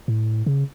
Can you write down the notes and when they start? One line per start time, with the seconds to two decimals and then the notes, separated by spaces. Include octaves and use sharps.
0.08 A2
0.46 C#3